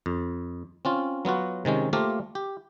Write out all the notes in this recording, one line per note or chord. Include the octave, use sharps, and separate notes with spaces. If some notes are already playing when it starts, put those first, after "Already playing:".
F2
C4 C#4 F4
F#3 B3 F4 F#4
C3 D#3 G#3 C#4
A3 A#3 F4 G4 A#4 C5
G4